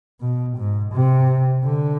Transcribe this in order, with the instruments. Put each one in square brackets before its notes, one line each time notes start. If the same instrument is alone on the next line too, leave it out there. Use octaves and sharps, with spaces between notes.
[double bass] B2
G#2
C3
D3